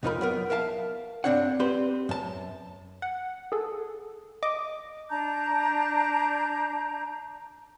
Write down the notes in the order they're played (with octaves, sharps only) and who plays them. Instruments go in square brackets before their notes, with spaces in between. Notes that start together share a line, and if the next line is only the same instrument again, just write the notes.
[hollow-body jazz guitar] B1 F2 D#4 F4 A#4 B5
F#3 B3 A#4
A#4 E5 F5 A5
G2 E3 C4 D4 C#5 F#5
C4 G4 B4 C5
F#2 A5
[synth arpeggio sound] F#5
G#4 A4
D#5 D6
[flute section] D4 A5 A#5 G6